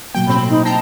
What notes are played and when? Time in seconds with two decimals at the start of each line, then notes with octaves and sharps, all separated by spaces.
0.15 B2 F#3 A#3 G5
0.27 A2 C4 B5
0.50 D#4
0.65 G5 A5 A#5 C7